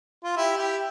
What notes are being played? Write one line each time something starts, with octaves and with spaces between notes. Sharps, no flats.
F4
E4 G4
E4 G4